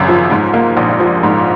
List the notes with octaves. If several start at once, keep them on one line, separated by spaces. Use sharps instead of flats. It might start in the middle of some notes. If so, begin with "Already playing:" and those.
Already playing: G#1 F#2 C#3
F3
G#2
A#3
A#1
F3
G#2